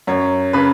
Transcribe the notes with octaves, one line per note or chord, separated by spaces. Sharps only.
F#2 C#5
C#3 B4